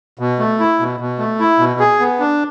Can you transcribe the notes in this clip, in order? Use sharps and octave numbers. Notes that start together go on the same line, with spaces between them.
B2
A3
E4
B2
B2
A3
E4
B2
G#4
B3
D4